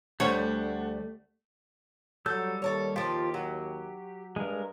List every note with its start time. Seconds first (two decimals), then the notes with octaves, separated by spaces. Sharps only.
0.20 D2 G3 A3 D4 C#5 F#5
2.26 F#3 G3 A4 E6 G6
2.62 D#2 A4 A#4 C#5
2.96 F3 F4 G4
3.34 F#3
4.36 G2 G#3 A#4